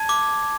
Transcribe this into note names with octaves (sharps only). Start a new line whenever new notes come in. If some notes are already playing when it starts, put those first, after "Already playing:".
Already playing: A5 G#6
D6